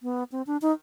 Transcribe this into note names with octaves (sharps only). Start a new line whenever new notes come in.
B3
C4
D4
D#4